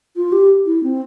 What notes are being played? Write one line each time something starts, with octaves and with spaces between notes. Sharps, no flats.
F4
G4
E4
C4